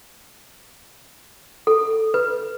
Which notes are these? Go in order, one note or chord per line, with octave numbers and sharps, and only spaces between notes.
A4
B4